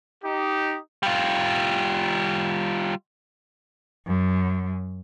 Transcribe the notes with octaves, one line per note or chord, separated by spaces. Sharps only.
D#4 G4
G3 F4
F#2